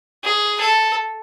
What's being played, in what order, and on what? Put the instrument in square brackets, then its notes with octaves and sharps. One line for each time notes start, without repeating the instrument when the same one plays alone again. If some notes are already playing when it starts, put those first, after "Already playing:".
[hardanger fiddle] G#4
A4